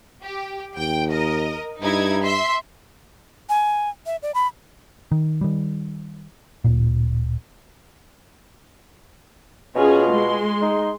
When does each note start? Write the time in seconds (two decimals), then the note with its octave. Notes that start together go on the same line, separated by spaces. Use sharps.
0.23 G4
0.78 D#2 G5
1.10 A#4 D#5
1.82 G2 D#4 E4 G#6
2.25 E5 C6 B6
3.49 G#5
4.06 E5
4.23 D5
4.35 B5
5.11 D#3
5.41 D#3 G3
6.64 D1 A#2
9.75 B2 C#4 F4 G#4
10.12 G#3 C6
10.62 D#4